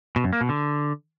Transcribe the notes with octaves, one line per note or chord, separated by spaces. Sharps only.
B2
F#2
A#3
B2
D3